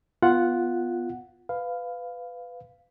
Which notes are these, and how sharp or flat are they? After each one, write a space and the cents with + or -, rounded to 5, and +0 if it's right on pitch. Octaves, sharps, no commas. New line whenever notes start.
B3 +0 F4 +0 F#5 +0
B4 +20 F5 +0